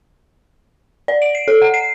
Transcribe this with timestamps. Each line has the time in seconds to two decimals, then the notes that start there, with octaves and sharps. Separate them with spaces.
1.08 D5
1.22 D7
1.35 C7
1.48 A4
1.62 F#5
1.74 C7